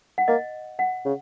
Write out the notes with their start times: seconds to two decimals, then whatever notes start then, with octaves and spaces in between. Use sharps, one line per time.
0.18 F#5
0.28 A#3 D#5
0.79 F#5
1.05 C#3